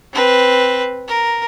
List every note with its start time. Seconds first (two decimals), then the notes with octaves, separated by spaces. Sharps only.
0.13 C4 B4
1.08 A#4